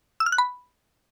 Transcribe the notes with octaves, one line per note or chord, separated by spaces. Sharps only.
E6
F6
F#6
B5